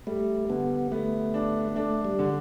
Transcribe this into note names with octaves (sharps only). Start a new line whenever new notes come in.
G3 A3
D3 B3
A3 B3
D4
A3 D4
G3
D3